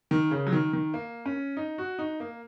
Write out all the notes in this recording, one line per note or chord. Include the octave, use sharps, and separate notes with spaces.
D#3
C#3
F#3
D#3
D#3
A#3
C#4
D#4
F#4
D#4
A#3